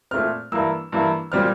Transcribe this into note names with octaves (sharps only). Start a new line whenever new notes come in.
A#2 A3 C4 F6
G2 E3 A#3 E6
G2 E3 A#3
A#2 G3 C4 F6